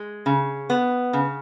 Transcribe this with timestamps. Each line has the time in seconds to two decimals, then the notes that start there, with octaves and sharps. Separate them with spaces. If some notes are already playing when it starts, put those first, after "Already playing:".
Already playing: G#3
0.26 C#3
0.70 B3
1.13 C#3